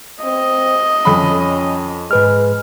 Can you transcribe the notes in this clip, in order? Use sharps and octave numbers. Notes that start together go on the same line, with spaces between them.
C4 D#5
F2 C#4 B5
G#2 G#3 B4 F6